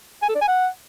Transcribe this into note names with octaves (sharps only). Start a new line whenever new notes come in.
G#5
A4
D5
G#5
F#5